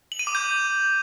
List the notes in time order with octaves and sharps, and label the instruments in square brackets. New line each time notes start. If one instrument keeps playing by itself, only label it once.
[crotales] F#7
D#7
D6
G6